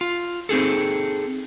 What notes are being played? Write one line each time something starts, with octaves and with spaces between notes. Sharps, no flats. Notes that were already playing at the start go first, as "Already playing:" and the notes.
F4
C4 D#4 G#4 A4